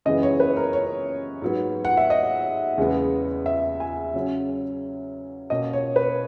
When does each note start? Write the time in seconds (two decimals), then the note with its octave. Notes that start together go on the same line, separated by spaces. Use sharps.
0.05 F#2 C#3 E3 G#3 B3 D#5
0.23 C#5
0.40 B4
0.57 A#4
0.73 C#5
1.42 G#2 F#3 B3
1.85 F#5
1.97 E5
2.10 D#5
2.78 E2 C#3 G#3 B3
3.46 E5
3.80 G#5
4.14 C#3 F#3 C#4
5.50 B2 A#3 C#4 D#5
5.73 C#5
5.96 B4